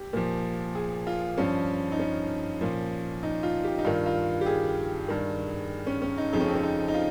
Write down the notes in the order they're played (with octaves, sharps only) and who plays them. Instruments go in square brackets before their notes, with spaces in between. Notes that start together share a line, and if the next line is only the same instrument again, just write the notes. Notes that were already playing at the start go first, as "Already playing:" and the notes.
Already playing: [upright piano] G4
A#2 F3
G#4
F4
G2 F3 C#4
D#4
C#4
A#2 F3
D#4
F4
G4
D#4
G2 D#3 F4
F4
G4
G#4
G2 D#3
C#4
C#4
D#4
F2 C#3 F3 D#4
C#4
C4
C#4
D#4
D#4
F4